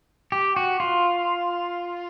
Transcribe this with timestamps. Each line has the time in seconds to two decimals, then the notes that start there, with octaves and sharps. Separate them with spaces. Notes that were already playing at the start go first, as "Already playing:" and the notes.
0.32 G4
0.56 F#4
0.80 F4